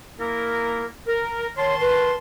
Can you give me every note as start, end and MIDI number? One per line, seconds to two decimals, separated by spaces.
0.19 0.86 58
0.19 0.86 64
0.19 0.86 70
1.07 1.47 70
1.57 2.16 51
1.57 1.75 73
1.57 2.16 81
1.57 2.16 84
1.80 2.12 71